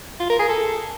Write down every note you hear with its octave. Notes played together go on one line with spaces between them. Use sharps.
F4
A#4
G#4
A4